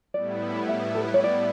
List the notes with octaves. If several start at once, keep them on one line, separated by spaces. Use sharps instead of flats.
A2 G3 B3 E4 D5
E5
A4
B4
C#5
D5